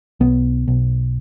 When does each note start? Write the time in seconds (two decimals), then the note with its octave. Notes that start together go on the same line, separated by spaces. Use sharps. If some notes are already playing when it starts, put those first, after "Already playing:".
0.20 B1 B3
0.68 B1